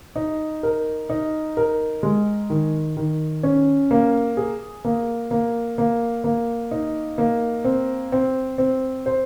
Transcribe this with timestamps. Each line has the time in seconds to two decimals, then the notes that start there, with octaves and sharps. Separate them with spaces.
0.16 D#4
0.63 A#4
1.10 D#4
1.57 A#4
2.03 G#3
2.50 D#3
2.97 D#3
3.43 C#4
3.91 A#3
4.37 G#4
4.85 A#3
5.31 A#3
5.78 A#3
6.24 A#3
6.71 D#4
7.18 A#3
7.64 C4
8.12 C4
8.58 C4
9.06 C5